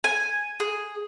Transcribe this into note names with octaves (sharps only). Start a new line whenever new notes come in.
G#5
G#4